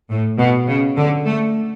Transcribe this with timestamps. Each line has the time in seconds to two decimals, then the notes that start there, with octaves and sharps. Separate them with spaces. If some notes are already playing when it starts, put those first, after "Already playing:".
0.10 A2
0.39 B2
0.68 C#3
0.97 D3
1.26 A3